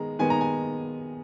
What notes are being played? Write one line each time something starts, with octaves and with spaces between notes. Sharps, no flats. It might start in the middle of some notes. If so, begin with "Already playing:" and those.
Already playing: D#3 G#3 B3 A#5
D#3 G#3 B3 G#5
A#5
G#5